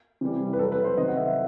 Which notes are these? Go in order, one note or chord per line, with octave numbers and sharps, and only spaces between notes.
C3 E3 G3
B4
A2 F#3 A3 A4
B4
C5
C3 D#3 F#3 A3 D#5
F#5
E5